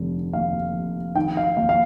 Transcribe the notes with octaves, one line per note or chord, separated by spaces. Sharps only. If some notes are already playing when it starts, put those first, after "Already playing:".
Already playing: F1 D3
D#2 F5
F1
D#3 G5
F5
D#2 F5
F5